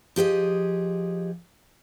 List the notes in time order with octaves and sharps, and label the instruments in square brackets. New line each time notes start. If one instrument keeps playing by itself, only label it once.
[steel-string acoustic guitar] F3 G4 G#4 D#5